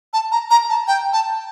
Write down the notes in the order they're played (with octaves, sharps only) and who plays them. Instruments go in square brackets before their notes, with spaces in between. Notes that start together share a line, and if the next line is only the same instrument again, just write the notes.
[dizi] A5
A#5
A#5
A5
G5
A5